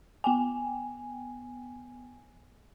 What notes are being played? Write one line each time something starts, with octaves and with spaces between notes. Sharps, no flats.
B3 G5 G#5